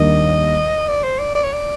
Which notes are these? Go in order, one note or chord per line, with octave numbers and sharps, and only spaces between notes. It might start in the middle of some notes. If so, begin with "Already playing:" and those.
Already playing: D#2 D#3 G3 A#3 D4 D#5
D5
C5
D5
D5
C#5
D5